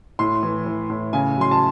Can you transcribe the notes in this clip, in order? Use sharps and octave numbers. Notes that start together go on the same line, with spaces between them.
A2 C6
E3
E3
A2
C#3 G#5
F#3 C6
A5